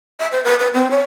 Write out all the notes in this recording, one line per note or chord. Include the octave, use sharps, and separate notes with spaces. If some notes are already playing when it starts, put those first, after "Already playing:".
E5
C5
B4
B4
C4
C#5